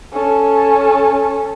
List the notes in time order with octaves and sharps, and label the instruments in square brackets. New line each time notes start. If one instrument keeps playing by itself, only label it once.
[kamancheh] C#4 A4